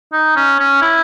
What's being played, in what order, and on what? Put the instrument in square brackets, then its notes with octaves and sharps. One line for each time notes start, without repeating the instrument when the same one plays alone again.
[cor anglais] D#4
C#4
C#4
E4